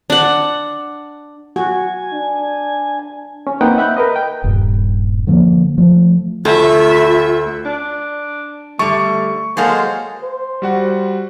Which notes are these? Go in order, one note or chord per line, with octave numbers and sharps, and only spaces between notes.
D4 F#5
F#4 G#5
D4
C#4
A#3 C4 D#4 B4 F#5 G5
E5 B5 F#6 G6
A#4 B4 D#5
G5
D#1 G2
D3 F3 A3 A#3
F3 A3
D2 A3 F4 E5
D4
D3 G3 A3 C#6
F#3 G#3 A#3 G#4 A4 C5 F5
C5
G3 F#4 F#5